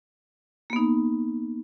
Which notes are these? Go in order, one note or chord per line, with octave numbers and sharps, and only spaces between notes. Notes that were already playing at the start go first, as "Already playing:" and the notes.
A#3 B3 D#4